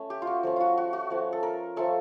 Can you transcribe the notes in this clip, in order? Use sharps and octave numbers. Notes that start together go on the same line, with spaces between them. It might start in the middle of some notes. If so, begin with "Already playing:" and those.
Already playing: A3 C#4
G4
F4
F#4
F3 A3 C#4
F4 F#4
F#4
F#4
F3 A3 C#4
A4
A#4
F3 A3 C#4 A4